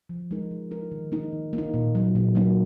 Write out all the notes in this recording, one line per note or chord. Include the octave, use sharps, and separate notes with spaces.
F3
G#3 D#4 A#4
F3
G#3 D#4 A#4
D#3
A#3 D#4
D#3
A#3
D#4
A#2
F#3 A#3 D#4
A#2
F#3 A#3 D#4